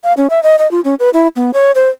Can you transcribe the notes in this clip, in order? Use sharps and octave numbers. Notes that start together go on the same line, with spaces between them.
F5
C#4
E5
D#5
D#5
F4
C#4
B4
E4
B3
C#5
C5